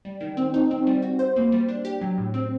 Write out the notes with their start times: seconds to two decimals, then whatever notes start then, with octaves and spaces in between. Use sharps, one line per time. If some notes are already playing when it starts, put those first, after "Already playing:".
0.05 G3
0.21 D#3
0.37 C4
0.54 D#4
0.71 C4
0.87 G3
1.02 F#4
1.19 C5
1.36 A#3
1.52 G3
1.68 D4
1.85 G4
2.01 F#3
2.18 A2
2.34 C4